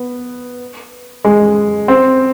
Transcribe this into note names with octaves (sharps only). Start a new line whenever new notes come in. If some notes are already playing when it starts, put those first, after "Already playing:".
Already playing: B3
G#3
C4